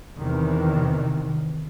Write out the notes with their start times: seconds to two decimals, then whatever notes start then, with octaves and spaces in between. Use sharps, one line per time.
0.17 E2 C3 D#3 E3